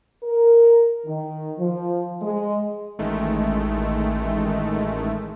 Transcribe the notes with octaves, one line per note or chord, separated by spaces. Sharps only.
A#4
D#3
F3
G#3
A1 D#3 G#3 A3